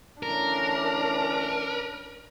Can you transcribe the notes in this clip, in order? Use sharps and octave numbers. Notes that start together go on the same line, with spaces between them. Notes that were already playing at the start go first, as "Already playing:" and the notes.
D2 E3 C#4 D4 A#4